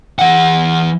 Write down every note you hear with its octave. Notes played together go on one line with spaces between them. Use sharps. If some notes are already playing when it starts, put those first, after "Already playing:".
E3 F#5